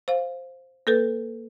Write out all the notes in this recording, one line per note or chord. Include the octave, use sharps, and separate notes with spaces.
C5 F5
A#3 A4 B4